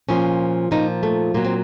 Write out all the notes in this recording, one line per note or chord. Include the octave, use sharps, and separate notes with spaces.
A#2 F3 C#4
A#2 F3 D#4
A3
A#2 F#3 A#3
C4